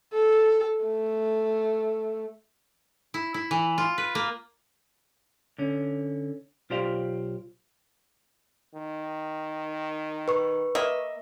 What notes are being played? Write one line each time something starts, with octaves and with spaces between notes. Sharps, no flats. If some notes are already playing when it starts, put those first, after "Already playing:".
A4
A3
E4
E4
E3
F4
B4
A#3
D3 C#4
B1 F4 G4 C5 D5 F5
D#3
B4 C#6
A#3 D#5 E5